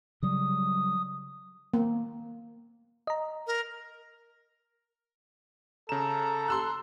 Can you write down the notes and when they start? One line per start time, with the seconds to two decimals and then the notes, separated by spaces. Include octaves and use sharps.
0.23 C#3 F#3 G3 D#6
1.74 A#3
3.07 D#5 A#5
3.47 A#4
5.89 C#3 A4 A#5 E7
6.48 C6 E6 F#6